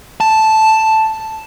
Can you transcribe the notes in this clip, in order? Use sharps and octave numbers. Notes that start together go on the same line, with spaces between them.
A5